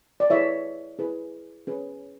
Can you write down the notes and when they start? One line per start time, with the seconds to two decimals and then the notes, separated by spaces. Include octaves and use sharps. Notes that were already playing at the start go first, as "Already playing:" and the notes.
0.20 D5
0.30 E4 G#4 B4 C#5 E5
0.99 E4 G#4 B4
1.67 C#4 G#4 B4